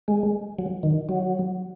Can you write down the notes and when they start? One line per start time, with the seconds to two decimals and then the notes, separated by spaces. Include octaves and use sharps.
0.08 G#3
0.59 F#3
0.83 D#3
1.09 F#3